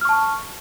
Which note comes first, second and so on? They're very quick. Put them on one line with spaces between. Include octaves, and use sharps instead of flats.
F6 C#6 A5